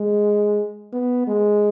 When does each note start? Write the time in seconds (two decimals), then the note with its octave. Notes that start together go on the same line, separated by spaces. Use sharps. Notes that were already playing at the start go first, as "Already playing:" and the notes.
Already playing: G#3
0.93 B3
1.28 G#3